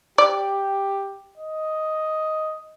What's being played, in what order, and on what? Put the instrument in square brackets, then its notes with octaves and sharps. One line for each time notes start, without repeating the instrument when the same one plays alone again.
[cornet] G4 [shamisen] D5
[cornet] D#5